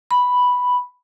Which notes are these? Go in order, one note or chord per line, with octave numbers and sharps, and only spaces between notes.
B5